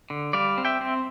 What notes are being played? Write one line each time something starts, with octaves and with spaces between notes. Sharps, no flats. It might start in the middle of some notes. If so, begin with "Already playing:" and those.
D3
G3 D5 F5
C4
E5 G5
C4